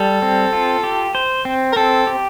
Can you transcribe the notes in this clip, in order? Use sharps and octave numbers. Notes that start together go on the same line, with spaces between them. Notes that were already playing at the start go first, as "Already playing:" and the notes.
Already playing: G3 A4
C4
F4
G4
C5
C4
A#4
C4 A4
G4